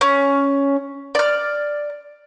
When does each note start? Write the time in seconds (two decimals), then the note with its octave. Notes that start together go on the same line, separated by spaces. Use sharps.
0.01 C#4
1.15 D5 F6